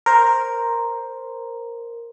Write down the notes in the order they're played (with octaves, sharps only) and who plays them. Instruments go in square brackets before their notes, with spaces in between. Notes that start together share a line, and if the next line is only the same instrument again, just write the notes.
[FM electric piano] A#4 C5